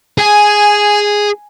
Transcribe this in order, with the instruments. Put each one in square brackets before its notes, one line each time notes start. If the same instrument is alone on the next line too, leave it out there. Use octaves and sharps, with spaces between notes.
[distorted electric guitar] G#4 [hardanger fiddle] G#5